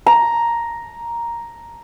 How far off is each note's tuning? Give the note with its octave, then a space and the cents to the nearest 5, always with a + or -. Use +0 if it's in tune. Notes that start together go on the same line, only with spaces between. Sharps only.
A#5 +5